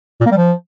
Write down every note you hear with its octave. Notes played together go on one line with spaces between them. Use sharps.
A#2
A#3
G3
F3